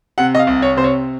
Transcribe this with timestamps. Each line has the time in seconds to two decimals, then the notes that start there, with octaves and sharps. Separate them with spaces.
0.18 C3 F#5
0.35 D#5
0.39 F5
0.47 C2
0.62 C#5
0.76 C3 C5
0.84 C#5